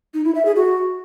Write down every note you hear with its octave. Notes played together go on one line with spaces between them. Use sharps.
D#4
E4
E5
G#4
F#4